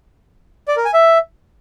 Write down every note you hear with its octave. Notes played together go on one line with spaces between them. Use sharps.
D5
A#4
G#5
E5